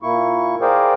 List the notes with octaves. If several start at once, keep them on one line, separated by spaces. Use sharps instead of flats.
A#2 A#3 E4 C#6
G#4 A#4 C5 D5 F5 G5